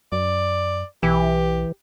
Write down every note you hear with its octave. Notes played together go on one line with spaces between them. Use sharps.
F#2 D5
B1 E3 G4